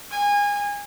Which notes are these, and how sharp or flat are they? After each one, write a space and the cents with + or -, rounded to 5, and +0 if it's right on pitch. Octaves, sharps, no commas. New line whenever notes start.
G#5 -25